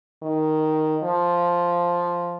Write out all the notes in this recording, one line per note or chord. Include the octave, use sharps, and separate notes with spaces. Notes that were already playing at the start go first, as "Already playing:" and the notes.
D#3
F3